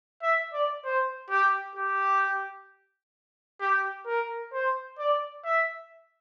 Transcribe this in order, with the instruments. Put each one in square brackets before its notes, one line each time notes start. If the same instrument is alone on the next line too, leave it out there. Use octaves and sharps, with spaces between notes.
[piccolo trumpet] E5
D5
C5
G4
G4
G4
A#4
C5
D5
E5